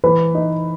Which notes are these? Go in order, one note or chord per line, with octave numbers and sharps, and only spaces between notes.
E3 B4
D#4